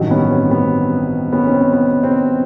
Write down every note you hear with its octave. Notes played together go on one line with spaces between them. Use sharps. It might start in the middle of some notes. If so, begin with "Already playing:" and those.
Already playing: A1 G2 D#3 F#3
B3 C#4
C4
B3
B3 C#4
C#4
C4
B3
C4